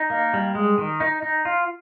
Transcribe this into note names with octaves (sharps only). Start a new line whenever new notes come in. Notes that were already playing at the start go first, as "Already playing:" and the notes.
Already playing: D#4
A#3
G3
G#3
D#3
D#4
D#4
F4